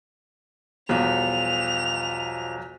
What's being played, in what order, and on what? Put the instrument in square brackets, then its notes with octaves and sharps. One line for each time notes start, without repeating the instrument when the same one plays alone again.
[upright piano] B1 E2 [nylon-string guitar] F3 G3 [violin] F7